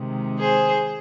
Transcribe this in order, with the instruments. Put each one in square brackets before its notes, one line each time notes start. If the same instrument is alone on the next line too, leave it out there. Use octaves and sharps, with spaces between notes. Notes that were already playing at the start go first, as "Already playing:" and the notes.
Already playing: [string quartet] C3 D#3 G#3
G#4 C5